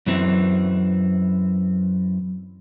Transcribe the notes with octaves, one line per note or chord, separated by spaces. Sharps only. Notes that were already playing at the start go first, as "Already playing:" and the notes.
F#2 E3 C4